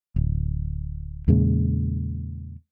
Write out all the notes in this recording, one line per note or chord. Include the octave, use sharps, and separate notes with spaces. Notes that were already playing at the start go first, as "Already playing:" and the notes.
D1
E2 A#2 C#3 G#3